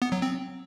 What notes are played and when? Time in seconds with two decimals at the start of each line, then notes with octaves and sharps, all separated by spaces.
0.02 B3
0.12 F#3
0.22 C4